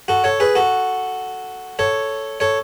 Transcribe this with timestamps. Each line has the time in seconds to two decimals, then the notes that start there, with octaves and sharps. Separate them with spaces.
0.08 F#4 A4
0.24 A4 C#5
0.40 G#4 B4
0.55 F#4 A4
1.79 A4 C#5
2.40 A4 C#5